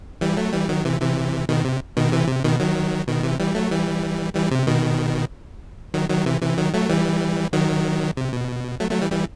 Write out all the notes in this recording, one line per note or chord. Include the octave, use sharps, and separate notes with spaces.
E3 G3
F#3 A3
E3 G3
D#3 F#3
C3 E3
C3 E3
B2 D#3
C3
B2 D#3
C3 E3
C3
B2 D#3
D#3 F#3
B2 D#3
C3 E3
E3 G3
F#3 A3
E3 G3
E3 G3
C3
B2 D#3
D#3 F#3
D#3 F#3
C3 E3
C3 E3
D#3 F#3
F#3 A3
E3 G3
D#3 F#3
C3
B2
F#3 A3
F#3 A3
E3 G3
E3 G3